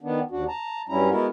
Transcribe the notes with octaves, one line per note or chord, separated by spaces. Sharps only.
D#3 B3 D4
D#2 D4 F#4
A5 A#5
G2 F#3 G3 C#4 E4 A#5
G#3 B3 E4 F#4 A#4